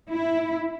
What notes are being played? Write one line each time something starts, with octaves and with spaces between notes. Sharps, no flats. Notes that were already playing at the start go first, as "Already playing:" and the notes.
E4